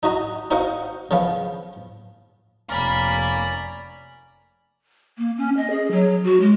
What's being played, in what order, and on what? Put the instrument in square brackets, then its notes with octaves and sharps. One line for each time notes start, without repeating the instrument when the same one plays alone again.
[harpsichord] D#4 F#4 D#5 A#5
D#4 F#4 C5 D#5 F5 F#5
C#3 F3 B3 F5
[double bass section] F1 [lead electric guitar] A#3 A#4 [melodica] C#4 D5 [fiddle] B5
[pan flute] A#3
C#4
D#5
G#4
F#3
F#4
G#3